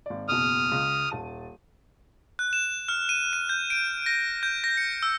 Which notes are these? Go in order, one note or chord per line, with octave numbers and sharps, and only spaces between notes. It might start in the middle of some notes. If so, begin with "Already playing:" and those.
G#1 D5
F#1 E2 B2 D#6 F6
C#2
D#1 A5 D#7
F#6
E7
F6
D#7
D#7
G6
D7
A#6
G6
A#6
C#7
E6